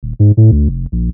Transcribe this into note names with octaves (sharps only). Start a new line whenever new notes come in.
D#1
G#2
A2
D2
F1
A#1